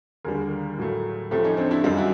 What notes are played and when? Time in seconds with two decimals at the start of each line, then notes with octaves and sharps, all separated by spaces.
0.25 D#2 D3 G3 G#4 A#4
0.78 A2 F#3 A3
1.31 C#2 C#3 F3 A3 G4 A4
1.44 C#4 D#4
1.57 C4 D4
1.71 D4 E4
1.84 F#2 D#3 G3 D#4 F4
1.97 E4 F#4